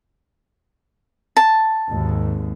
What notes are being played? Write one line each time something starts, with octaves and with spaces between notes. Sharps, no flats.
A5
G#1 D#2 G#2